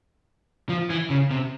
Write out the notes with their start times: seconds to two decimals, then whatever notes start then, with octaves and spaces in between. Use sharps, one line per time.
0.69 F3
0.90 E3
1.10 C#3
1.31 C3